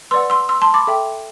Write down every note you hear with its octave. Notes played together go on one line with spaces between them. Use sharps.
B4 D5 F#5 C6 E6
C6 E6
C6 E6
A5 C6
B5 D6
A4 E5 G5